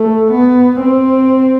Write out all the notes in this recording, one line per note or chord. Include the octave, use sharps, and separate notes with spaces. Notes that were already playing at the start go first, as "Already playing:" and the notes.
Already playing: A3
B3
C4